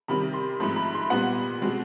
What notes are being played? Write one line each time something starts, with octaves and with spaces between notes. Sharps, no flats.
C3 D#3 G3 C4 B5
C6
G#2 F3 A3 C4 B5
B5
C6
A#2 G3 B3 F#5
B2 G#3 C4